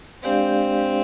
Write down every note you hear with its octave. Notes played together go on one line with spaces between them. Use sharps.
G#3 C4 D4 G4 D5 F5